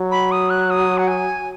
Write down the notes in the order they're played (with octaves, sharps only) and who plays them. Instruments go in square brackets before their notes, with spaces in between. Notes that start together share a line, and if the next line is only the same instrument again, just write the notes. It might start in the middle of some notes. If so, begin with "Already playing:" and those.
Already playing: [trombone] F#3
[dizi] B5
D#6
F#6
D#6
F#5
G#5